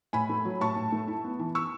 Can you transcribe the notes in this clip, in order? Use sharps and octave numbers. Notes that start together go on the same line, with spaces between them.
A2 G#5 B5
A3
F#3
A2 A5 C#6
A2
A3
E4
B3
E3
C#6 E6